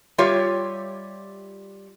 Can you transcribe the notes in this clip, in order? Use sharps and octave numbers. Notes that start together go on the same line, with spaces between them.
G3 F4 G4 C#5 E5